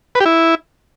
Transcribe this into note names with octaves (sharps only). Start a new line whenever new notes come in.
B4
G4
E4